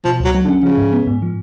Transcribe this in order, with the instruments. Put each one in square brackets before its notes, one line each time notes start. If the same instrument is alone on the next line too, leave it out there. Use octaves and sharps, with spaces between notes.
[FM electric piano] B2 [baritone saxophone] F3
[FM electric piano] C#2 [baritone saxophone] F#3
[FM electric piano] F#3
[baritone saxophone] D3
[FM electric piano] C#4
[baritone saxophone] C#3 [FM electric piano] F3
[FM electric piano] G#2
B3
G#2
F3